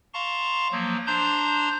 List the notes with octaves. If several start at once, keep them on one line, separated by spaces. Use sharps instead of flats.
F5 A5 A#5 C6 C#6
F3 F#3 A#3
D4 C5 A#5 C6 G6